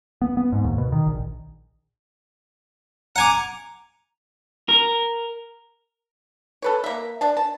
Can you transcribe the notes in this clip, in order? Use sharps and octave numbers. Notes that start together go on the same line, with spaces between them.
B3
B3
G#2
D#2
B2
D#3
A#1
F#5 G#5 A#5 D6
A#4
A4 B4 C#5
A#3 E5
D4 A5
A5